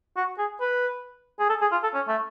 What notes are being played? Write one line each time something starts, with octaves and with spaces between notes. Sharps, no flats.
F#4
G#4
B4
G#4
A4
G#4
F4
A4
C#4
A3